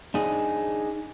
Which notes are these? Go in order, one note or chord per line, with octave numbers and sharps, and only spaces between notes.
D4 D#4 G#4